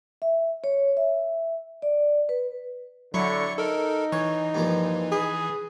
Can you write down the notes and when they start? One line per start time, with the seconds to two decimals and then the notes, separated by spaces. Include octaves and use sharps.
0.22 E5
0.64 C#5
0.97 E5
1.82 D5
2.29 B4
3.14 D3 F#3 E4 C#6 C#7
3.58 D#4 A4 A#4
4.12 E3 C#5
4.54 G2 A#2 F3
5.12 G#4 B4